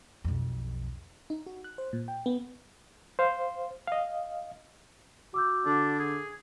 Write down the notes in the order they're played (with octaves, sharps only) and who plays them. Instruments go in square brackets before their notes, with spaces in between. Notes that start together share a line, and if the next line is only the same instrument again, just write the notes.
[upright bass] B1 F2
[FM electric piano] D#4
F#4
F#6
C5
A#2
G5
B3
[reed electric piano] C5 F5
D#5 F5
[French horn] F#4 [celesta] D6 E6 G6
[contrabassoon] D3 [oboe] D4
[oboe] G#4